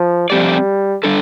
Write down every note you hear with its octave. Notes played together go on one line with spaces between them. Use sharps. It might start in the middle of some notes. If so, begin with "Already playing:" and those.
Already playing: F3
F3 G3 A3 C4 G4 D5
D3 G3 D4 A4